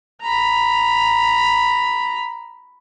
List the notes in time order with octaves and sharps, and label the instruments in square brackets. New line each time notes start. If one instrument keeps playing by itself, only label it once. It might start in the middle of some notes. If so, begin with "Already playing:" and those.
[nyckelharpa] A#5 B5